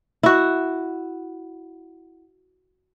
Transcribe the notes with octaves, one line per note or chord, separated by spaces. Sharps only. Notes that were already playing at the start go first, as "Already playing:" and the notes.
E4 F#4